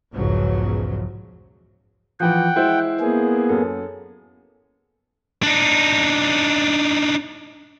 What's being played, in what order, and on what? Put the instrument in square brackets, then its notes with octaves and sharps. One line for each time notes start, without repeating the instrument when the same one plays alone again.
[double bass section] B1 E2 G#2 C#3 F3 F#3
[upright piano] E3 F3 [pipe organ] F#5 G5
[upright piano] G#3 E4 C5
[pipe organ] A#3 B3 G#4
[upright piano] F#2 A4
[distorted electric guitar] D4 D#4